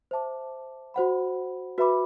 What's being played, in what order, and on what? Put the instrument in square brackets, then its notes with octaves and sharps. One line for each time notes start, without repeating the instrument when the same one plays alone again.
[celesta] C5 E5 A5 D6
F#4 C5 F#5 B5
F#4 B4 E5 B5 D6